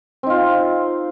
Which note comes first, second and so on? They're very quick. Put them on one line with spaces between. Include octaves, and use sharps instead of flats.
C4 D#4 F4